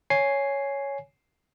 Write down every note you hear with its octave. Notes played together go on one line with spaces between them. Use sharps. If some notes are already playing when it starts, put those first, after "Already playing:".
C#5 G#5 C7